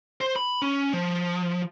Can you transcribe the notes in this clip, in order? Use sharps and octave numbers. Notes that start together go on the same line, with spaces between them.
C5
B5
C#4
F3